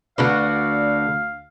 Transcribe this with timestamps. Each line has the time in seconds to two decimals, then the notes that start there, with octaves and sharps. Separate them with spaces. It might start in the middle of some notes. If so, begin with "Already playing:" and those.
0.18 D2 D3 F#4 B4 D5 F5